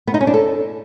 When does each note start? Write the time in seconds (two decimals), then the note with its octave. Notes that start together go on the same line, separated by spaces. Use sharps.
0.07 B3
0.14 D#4
0.21 C#4
0.27 D4
0.34 A4